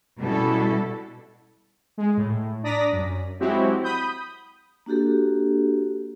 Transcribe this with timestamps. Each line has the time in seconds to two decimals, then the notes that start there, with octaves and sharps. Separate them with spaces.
0.18 B2 G3 C#4 E4 A4
1.98 G#3
2.17 A2
2.63 D4 D5 A#5 D#6 A#6 B6
2.92 F#2
3.40 F#3 G#3 C4 E4 F#4 G4
3.84 B5 D#6 G6
4.86 A#3 D4 F#4 G4 A4